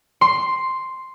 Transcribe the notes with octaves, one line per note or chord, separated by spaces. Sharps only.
C6